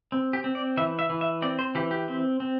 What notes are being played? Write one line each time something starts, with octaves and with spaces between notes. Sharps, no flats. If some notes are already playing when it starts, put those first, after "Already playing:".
C4
G4
C4
D5
E3 E5
E5
E3
E5
C4 D5
C5
E3 G4
G4
C4
C4